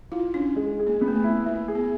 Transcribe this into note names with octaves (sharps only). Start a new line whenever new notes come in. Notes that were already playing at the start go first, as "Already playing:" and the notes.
E4 F4
C#4 D4
G#3
G#4
A#3
B3
A3
A#3
E4
A#3 E4
G#4
B3